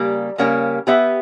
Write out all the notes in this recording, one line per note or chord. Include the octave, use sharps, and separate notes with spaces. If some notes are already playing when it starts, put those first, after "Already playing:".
Already playing: C#3 G3 A#3 G4
C#3 G3 A#3 C#4 G4
B3 G4 B4 E5